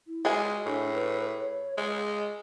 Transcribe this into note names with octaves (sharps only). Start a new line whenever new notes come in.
E4
G#3 F#4 G#4 G#5
A2 D4
B4
C#5
G#3 D#5